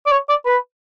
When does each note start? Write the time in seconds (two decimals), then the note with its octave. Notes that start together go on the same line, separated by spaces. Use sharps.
0.06 D5
0.11 C#5
0.29 D5
0.46 B4